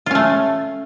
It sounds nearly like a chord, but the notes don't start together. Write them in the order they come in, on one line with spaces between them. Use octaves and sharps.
F4 C#4 A3